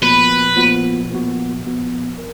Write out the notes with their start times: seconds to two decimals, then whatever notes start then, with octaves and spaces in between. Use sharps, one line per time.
0.02 A#2 F3 B3 F#4 B4
0.56 A#2 F3 B3 F#4
1.10 A#2 F3 B3 F#4
1.65 A#2 F3 B3 F#4
2.18 A#4